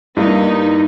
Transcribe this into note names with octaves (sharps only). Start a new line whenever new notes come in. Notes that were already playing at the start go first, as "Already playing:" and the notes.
G2 G3 A#3 D#4 E4